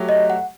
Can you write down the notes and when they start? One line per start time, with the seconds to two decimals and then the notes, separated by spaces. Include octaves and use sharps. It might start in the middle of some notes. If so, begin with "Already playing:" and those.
Already playing: F#3 A3 G4
0.09 D#5
0.30 F#5